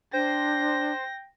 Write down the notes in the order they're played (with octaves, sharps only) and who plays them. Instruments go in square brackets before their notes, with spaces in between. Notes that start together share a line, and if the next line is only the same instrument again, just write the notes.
[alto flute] D4 [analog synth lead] C5 [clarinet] G5 [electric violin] A#6